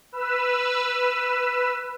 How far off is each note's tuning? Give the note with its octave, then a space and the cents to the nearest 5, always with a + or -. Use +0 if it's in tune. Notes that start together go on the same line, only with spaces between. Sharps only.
B4 +0 E6 +20